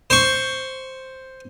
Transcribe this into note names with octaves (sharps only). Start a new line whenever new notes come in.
C5 C#6